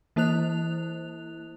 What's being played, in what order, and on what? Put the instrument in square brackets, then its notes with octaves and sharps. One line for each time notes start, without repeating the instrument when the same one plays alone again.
[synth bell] E3 A#3 E4 C5 F#6 F7